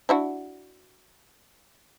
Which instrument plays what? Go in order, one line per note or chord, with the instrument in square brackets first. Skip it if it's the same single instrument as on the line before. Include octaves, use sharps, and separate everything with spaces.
[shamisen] D4 E4 F#4